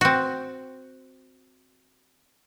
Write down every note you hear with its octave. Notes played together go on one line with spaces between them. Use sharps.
C4 F#4